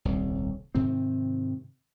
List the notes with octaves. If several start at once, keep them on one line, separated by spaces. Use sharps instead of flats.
D#1 C2
G#2 C3 D#3 C4